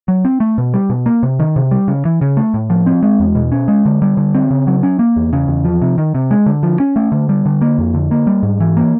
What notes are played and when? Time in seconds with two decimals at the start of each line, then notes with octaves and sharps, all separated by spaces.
0.08 F#3
0.25 C4
0.40 A3
0.58 B2
0.74 G3
0.90 B2
1.06 A#3
1.23 C3
1.39 D#3
1.56 C3
1.71 G3
1.88 C#3
2.05 E3
2.21 C#3
2.37 A3
2.54 A2
2.70 F3
2.86 C4
3.03 G#3
3.20 E2
3.35 B2
3.52 C#4
3.68 G#3
3.85 D3
4.02 G3
4.17 D3
4.35 C4
4.51 C#3
4.67 F#3
4.83 C#4
4.99 A#3
5.16 E2
5.33 C#3
5.48 E2
5.65 F3
5.82 C3
5.98 D#3
6.15 C3
6.31 G#3
6.46 D3
6.63 F3
6.80 C#4
6.96 A3
7.12 D3
7.29 G3
7.46 D3
7.61 A#3
7.78 F2
7.94 D3
8.11 A#3
8.27 G3
8.43 G#2
8.60 E3
8.77 A#3